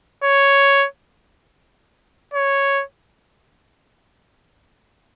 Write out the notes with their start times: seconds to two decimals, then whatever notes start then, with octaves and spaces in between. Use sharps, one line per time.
0.24 C#5
2.34 C#5